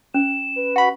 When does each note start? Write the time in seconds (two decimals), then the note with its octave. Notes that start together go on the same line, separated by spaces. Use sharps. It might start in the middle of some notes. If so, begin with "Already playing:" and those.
0.14 C#4 E7
0.56 B4
0.76 F#4 B5